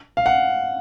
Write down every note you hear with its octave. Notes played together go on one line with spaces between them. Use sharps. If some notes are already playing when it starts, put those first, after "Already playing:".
F5
F#5